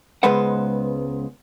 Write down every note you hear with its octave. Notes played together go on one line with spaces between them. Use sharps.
C#2 G#3 B3 B4 C5 F#5